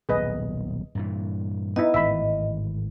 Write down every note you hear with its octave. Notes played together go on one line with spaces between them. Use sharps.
D#1 B1 G#4 B4 D#5
G2 A#2 E3
B3 D#4 E4 D#5
G#1 A2 E3 E5 B5